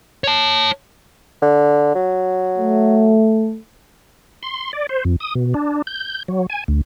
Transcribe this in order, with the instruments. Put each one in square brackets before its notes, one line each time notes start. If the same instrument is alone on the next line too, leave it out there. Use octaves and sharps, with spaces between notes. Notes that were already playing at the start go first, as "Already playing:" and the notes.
[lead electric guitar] C#5 A5
[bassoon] D3
F#3
[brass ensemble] A3
[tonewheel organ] C6
D5
C5
F2
D#6
B2
D4
G6
F#3
G#5
D2